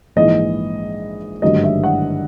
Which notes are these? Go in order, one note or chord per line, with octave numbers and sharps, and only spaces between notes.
A#1 G#2 E3 D#5
G#1 G2 D3 F#3 A3 D#5
E5
F#5